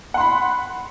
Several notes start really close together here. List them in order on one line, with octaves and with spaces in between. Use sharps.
F#5 C6 B5